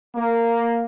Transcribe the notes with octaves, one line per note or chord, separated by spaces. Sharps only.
A#3